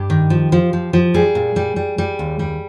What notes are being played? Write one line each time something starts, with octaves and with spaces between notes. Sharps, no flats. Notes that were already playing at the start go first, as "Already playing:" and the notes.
Already playing: G2 G4
D#3
F3
F3
F3
F3
G3 G#4
A#2
G3
G3
G3
D#2
G3